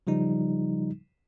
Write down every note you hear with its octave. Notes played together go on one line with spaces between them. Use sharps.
C#3 F3 G3 D#4